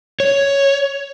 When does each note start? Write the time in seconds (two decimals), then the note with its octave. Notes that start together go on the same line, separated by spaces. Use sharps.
0.20 C#5